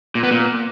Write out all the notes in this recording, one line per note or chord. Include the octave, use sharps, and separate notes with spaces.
A#2
B3
A#2